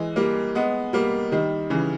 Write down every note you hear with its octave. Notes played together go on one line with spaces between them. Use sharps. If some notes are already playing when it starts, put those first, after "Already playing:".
Already playing: E3 G#3
G3 A#3
G#3 B3
G3 A#3
D#3 G3
C#3 E3